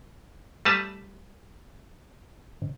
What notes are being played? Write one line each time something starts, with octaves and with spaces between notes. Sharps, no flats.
G3 A3 B4 A5 A#5